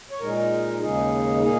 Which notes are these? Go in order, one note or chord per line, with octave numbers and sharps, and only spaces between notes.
C#5
A#2 G#3 D#4 A#4
D#2 C#3 G#3 D#4 G#4
A#2 A#3 D#4 G#4